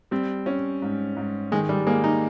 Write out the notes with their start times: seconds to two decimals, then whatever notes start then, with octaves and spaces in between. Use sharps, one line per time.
0.11 G3 C4
0.46 C#4
0.82 G#2
1.17 G#2
1.52 D#3 G#3
1.69 G3
1.87 G#3 A#3
2.04 D#4